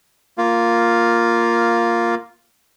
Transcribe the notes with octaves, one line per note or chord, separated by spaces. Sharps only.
A#3 F4